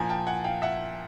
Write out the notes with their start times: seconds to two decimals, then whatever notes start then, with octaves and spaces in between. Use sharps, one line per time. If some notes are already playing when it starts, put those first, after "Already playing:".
Already playing: A#2 F3 G#5 A#5
0.09 G5 A5
0.27 F#5 G#5
0.44 F5 G5
0.62 E5 F#5